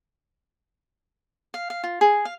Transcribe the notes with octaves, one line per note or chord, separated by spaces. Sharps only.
F5
F5
F4
G#4
F5